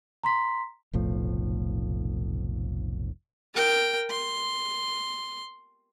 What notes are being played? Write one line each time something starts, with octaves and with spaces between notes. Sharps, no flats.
A#5 C6 B6
F1 B1 A2 F3
A#4 G5
C6